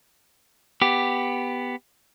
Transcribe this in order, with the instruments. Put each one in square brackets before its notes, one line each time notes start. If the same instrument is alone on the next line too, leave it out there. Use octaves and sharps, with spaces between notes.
[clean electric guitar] B3 G4